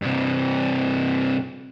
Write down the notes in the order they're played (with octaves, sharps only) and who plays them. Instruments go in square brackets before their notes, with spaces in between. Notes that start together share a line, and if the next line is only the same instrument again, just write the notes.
[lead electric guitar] G2 C3